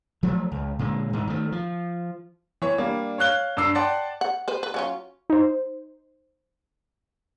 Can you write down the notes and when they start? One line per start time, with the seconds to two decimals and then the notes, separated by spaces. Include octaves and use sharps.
0.23 F3 F#3 A3
0.52 C#2
0.79 A#2 D3 G#3
1.13 G#2 E3
1.27 D#3 A3
1.52 F3
2.62 E3 C#5
2.78 G3 A#3 D4
3.18 C#5 F5 F#6 G7
3.57 G2 D6 E6 C7
3.75 D5 F#5 G5 A5 C6
4.21 F#5
4.48 B4 C5
4.63 B4
4.74 F#3 C#4 F4
5.30 D#4 C5